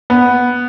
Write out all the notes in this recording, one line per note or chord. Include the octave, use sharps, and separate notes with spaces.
B3